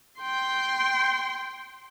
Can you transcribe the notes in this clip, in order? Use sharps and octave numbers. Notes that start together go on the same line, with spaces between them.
G5 C6